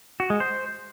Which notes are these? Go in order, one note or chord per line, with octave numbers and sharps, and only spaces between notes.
F#4
G#3
C5